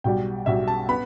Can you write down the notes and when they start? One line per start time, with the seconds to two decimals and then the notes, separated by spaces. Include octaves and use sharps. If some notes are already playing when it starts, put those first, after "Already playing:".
0.04 B1 B2 G3 G5
0.46 B1 B2 G3 E5
0.68 A5
0.89 B3 B5